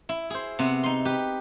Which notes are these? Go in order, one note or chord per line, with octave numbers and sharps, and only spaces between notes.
E4
G#4 C5
C3 B3 F#5
D#4 C6
G4 B4